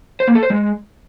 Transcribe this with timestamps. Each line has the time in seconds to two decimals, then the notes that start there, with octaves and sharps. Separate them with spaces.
0.20 C5
0.28 A#3
0.35 A4
0.43 C5
0.50 G#3